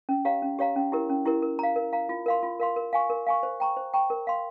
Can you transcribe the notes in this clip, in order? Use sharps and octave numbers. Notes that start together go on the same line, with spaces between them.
C#4
G4 C#5 F5 A#5
C#4
G4 C#5 F5 A#5
C#4
E4 G4 A#4
C#4
E4 G4 A#4
A#4
F5 A#5
A#4
F5 A#5
F4
A#4 F5 C6
F4
A#4 F5 C6
A#4
F5 G#5 C#6
A#4
F5 G#5 C#6
C5
G5 A#5 C#6
C5
G5 A#5 C#6
A#4
F5 C6